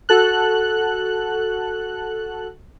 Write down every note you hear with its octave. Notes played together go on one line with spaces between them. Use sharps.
F#4 A4 F#6